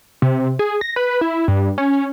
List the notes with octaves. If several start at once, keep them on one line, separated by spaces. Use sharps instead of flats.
C3
G#4
A#6
B4
E4
G2
C#4